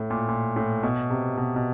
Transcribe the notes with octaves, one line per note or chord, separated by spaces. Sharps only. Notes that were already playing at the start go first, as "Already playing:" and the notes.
Already playing: A2
A#2
A#2
A2
B2
C3
B2
B2